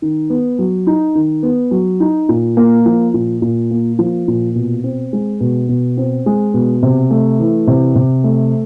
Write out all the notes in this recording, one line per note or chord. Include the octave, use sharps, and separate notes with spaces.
D#3
B3
F#3
D#4
D#3
B3
F#3
D#4
A#2
A#3
F3
A#2
A#2
A#3
F3
A#2
B2
C4
G#3
B2
B2
C4
G#3
B2
C3
A3
E3
C3
C3
A3